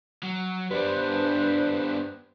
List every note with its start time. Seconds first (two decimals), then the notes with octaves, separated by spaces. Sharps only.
0.23 F#3
0.71 G2 B3 D4 B4 C5